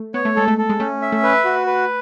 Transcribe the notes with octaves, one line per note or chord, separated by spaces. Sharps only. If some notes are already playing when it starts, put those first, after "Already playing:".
Already playing: A3
B3 C#5
A3
G#3 A4
A3
A4
G#3
A3 C#4
E5
A3
B4
F#4
B4